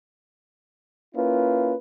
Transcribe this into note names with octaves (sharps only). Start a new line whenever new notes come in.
A#3 C#4 E4 F4 B4